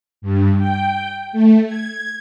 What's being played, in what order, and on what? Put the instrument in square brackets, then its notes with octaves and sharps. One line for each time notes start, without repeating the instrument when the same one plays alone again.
[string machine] G2
G5
A3
G#6